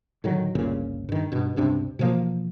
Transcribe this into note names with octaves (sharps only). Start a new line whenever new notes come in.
A2 D3 D#3 F#3
G1 C#2 A#2 C#3
G2 D#3
G2 B2
C#2 G2 C3 D4
B2 E3 F3 A#3